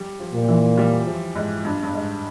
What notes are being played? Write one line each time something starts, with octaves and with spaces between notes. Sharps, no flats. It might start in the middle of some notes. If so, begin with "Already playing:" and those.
Already playing: G3
F3
A#2
E3
G3
F3
G#2
G2
G2
G#2